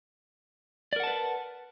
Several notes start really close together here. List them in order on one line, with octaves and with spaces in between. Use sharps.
D5 A#4 F#5 A5 B4